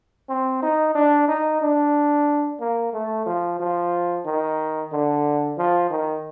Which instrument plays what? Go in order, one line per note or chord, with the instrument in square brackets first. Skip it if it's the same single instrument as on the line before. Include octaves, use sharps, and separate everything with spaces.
[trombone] C4
D#4
D4
D#4
D4
A#3
A3
F3
F3
D#3
D3
F3
D#3